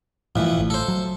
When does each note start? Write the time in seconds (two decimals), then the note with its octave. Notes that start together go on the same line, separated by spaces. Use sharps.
0.36 F2 A#2 E3 A3
0.57 A1 A2
0.70 A4 C5
0.88 F#3